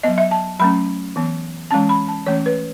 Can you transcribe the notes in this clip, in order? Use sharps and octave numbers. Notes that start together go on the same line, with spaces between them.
F#3 B3 D#5
E5
A5
F#3 A3 C#4 B5
E3 B3
E3 G#3 C#4 A5
B5
A5
E3 A3 C#4 C#5
B4